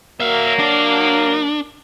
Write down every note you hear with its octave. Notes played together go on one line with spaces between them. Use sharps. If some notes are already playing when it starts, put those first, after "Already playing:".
F#3 A#3 E5 F5
D4